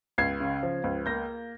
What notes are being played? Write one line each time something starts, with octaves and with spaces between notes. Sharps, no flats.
C#2 G#6 C7
C#3
F3
C#2
A#3 G6 A#6